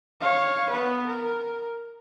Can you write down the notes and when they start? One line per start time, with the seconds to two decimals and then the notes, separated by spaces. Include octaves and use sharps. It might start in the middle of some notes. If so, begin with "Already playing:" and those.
0.21 C#5 F5
0.70 B3 B4
1.07 A#4